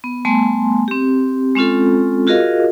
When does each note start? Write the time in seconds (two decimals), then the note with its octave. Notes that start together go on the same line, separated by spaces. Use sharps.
0.04 B3
0.25 G3 A3 B3 G#5 A5 C6
0.88 C4 G4
1.55 G#3 C4 C#4 F4 A4
2.27 F4 F#4 G#4 A#4 D#5 F5